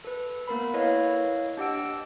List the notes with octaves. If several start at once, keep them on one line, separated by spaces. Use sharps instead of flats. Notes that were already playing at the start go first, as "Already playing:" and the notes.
A4 B4
A#3 B3 A#4 B5
E4 A4 B4 C#5 D#5 F5
D4 G4 D#5 F#5 E6 D7